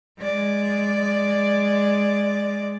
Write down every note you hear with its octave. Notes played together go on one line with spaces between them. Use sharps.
G#3 D5